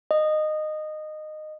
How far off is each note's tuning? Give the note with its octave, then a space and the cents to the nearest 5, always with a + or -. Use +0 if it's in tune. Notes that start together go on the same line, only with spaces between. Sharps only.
D#5 -15